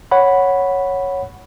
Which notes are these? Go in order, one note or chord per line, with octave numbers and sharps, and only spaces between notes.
C#5 F#5 B5